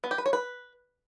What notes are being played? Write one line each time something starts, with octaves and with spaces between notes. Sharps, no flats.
B3
G4
B4
C#5
B4